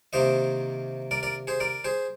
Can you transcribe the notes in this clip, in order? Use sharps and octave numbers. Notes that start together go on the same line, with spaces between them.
C3 D#3 A#3 C5 D#5
A#4 D5
A#4 D5
G#4 C5
A#4 D5
G#4 C5